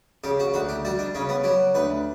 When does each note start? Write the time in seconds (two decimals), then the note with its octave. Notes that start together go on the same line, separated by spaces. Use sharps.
0.24 C#3 G4
0.40 F#4
0.54 D2 F#4
0.69 G4
0.85 G3 F#4
0.99 D4
1.15 C#3 C#4
1.29 B3
1.44 F#3 G4
1.75 D2 B4